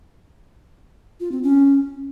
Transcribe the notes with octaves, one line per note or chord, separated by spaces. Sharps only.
F4
C4
C#4